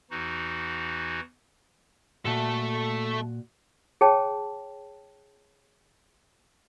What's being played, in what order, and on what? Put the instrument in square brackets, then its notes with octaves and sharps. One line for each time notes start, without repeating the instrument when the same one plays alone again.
[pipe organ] E2 E3 D#4 F#4
[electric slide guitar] A#2 F#4 [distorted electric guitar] A3 A4
[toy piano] G#4 C#5 G5 A5